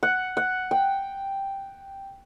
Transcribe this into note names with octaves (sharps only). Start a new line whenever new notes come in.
F#5
F#5
G5